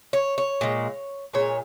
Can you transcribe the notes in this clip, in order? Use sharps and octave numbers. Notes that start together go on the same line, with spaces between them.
C#5
C#5
A#2 G#3
A#2 G#3 C#5